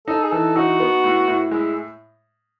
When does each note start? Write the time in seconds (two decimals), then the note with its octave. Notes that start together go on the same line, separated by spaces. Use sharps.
0.08 D#4 A4
0.23 G#4
0.31 E3 A4
0.56 D#4 F#4
0.80 B3
1.04 A2
1.28 A2
1.51 G#3 E4